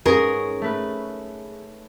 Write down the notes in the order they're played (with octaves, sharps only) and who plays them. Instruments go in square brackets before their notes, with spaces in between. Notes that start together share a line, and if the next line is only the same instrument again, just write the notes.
[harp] G#2 C#4 [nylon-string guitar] G#4 A#4
[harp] A3 B4